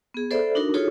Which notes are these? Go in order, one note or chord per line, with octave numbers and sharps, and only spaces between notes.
B3 G#4
A4 C5 D5 E5 B5
D4 D#4 F#4 A#4
D#4 F4 F#4 G#4 A4 C#5